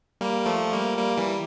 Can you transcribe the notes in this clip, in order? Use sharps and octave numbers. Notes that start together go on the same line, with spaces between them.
G3 A#3
F3 A3
G3 A#3
G3 A#3
E3 G3